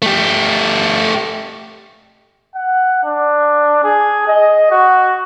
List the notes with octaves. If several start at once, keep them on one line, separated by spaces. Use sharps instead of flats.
A3 G4
F#5
D4
G#4
D#5
F#4